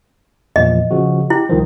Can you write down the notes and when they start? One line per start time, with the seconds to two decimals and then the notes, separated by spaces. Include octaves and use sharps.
0.56 E2 A#2 F3 D#5
0.91 C#3 F3 F#4
1.30 E4 G4
1.49 C2 D#3 F3